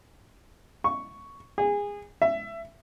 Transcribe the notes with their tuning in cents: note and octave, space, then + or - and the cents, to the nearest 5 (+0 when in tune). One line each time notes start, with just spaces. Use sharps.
C#6 +5
G#4 -25
E5 +20